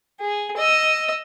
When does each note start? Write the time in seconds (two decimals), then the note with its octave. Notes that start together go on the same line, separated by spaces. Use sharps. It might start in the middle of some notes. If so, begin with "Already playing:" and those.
0.20 G#4
0.57 D#5 E6